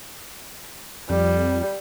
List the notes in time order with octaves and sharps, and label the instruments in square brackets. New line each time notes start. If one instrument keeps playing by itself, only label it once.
[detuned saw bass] F2 [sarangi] G3